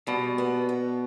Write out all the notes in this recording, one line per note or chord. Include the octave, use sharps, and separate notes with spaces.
B2 G3
B3
B3